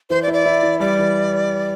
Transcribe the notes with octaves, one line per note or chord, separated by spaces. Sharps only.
E3 C5
D5
E4
D5
E4
E3
G3 D5
E3